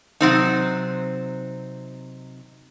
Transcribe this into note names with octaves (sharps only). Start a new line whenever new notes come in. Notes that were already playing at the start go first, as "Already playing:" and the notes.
C3 F#3 C4 D#4